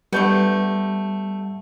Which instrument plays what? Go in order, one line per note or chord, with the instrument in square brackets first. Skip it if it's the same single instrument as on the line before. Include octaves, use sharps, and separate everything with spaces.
[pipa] D3 A3 B3 [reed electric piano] G3 G6